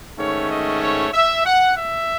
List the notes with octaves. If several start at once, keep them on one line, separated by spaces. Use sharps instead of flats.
G#2 D#3 A3 C#4 C#5
D#5
C#5
E5
F#5
E5